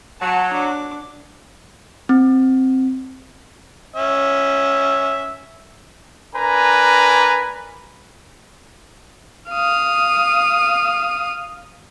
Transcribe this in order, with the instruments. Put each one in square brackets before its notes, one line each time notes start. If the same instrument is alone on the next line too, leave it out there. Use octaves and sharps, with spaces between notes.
[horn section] F#3 [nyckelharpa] A5
[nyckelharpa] D4 D6
[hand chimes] C4
[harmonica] C#4 E5
[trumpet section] D4 A#4 B4 G#5 A#5
[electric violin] F5 D#6